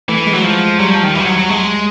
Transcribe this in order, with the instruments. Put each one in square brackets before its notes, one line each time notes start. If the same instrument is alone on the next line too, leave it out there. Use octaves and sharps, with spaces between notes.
[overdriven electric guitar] E3 [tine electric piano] A3
[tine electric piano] G#3
[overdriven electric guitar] F#3
F3
[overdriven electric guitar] F#3 [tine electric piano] G3
[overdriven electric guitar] F3
D#3
E3
F3
F#3
F#3
G#3